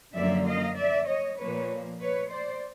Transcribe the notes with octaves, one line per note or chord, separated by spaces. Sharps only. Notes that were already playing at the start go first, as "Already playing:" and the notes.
F#2 D3 F3 A#3 D5 E5
D#5 F5
D5 E5
C#5 D#5
A#2 F3 A#3 B4 C#5
B4 C#5
C5 D5